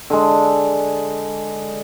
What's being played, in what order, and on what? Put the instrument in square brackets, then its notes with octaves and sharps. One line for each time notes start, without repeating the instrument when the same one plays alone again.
[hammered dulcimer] D3 G#3